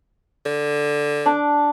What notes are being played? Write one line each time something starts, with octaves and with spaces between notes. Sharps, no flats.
D3
D4 D6